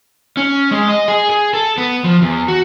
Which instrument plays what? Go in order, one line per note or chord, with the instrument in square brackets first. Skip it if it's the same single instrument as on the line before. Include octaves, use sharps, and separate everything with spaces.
[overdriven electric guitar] C#4
G#3
D#5
G#4
G#4
A4
B3
F3
E2
F#4